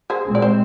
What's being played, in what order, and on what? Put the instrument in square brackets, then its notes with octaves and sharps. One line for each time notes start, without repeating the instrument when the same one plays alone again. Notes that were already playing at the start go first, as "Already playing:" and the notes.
[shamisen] G#4 C5
[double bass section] A#2 G#3 C4
[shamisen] D5
C5